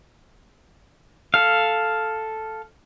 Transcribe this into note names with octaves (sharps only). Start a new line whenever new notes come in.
A4 F5